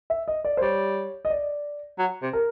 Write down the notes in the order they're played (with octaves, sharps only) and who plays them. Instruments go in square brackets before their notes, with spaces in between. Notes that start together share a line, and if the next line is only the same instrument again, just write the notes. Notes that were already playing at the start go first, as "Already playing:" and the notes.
[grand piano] E5
D#5
D5
C5
[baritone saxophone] G3 [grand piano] C#5
[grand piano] D#5
D5
[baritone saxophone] F#3
C3
[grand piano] A#4